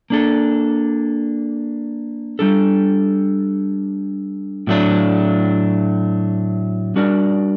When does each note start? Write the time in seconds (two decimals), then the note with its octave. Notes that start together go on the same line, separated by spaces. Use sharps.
0.10 A#3 D4 A4
2.39 G3 D4 A4
4.67 A2 F#3 A3 D4
6.96 G3 D4 F#4 A#4 D5